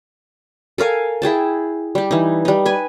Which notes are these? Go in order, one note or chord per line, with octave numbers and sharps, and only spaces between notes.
A4 A#4 F5 G#5
E4 G#4 G5 A5
G3 G4
E3 D#4
G3 D#4
B4 G#5